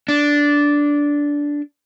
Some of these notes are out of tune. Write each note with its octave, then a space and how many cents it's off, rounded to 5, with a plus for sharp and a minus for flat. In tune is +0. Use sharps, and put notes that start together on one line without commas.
D4 -10